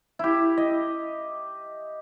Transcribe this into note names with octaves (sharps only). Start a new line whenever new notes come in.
E4 G4
D#5